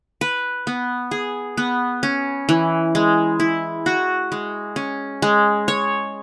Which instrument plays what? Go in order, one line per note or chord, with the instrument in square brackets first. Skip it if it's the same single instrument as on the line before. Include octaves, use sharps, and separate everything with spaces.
[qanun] B4
B3
G#4
B3
C#4
E3
G#3
E4
F#4
G#3
C#4
G#3
C#5